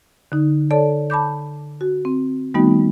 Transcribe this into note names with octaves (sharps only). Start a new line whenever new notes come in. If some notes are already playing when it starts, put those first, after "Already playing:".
D3 D#4
A4 C#5 D5 A5
A5 B5 D6 G6
F#4
C4
D#3 G3 A3 B3 D#4 F#4